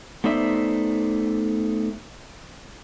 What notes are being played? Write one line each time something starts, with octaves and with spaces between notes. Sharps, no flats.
A3 B3 D#4 C5 D5 E5